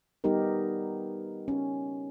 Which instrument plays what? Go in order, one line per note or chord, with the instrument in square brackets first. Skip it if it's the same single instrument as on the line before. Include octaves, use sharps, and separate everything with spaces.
[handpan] G3 B3 D#4 G4 A#4
C#4